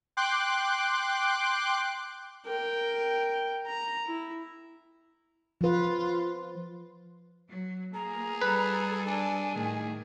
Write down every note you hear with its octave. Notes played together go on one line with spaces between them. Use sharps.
G5 C6 D6 F#6
A#4 G5
A#5
E4
F3 F4 B4
F#3
A#3 G#4 A#5
G3 A4 B4
D4 G#5
A2 D#3 A3 G#4